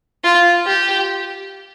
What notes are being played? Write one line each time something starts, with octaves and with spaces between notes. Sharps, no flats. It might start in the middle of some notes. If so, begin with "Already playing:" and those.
F4
G4